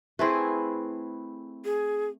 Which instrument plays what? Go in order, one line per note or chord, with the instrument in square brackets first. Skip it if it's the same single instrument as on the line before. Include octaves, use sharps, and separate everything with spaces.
[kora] A3 C4 [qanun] E4 G#4 B4
[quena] G#4